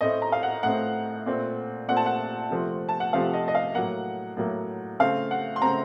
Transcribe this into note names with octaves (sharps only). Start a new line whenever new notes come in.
A2 A3 C4 D#5
A#5
F5
F#5
A2 A3 C4 F#5
A#2 A3 C4
A#2 A3 C4 F#5
A5
F#5
C3 F3 A3 C4
A5
F#5
C3 F3 A3 C4 F5
D#5
D#5
F5
A2 F#3 A#3 F#5
A2 F#3 A#3
C#3 A3 C4 F5
F#5
C6
C#3 A3 C4 A#5